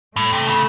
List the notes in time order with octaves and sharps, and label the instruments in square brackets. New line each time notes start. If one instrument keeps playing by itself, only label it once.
[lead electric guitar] A2 [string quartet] A3
[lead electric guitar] C3
C#3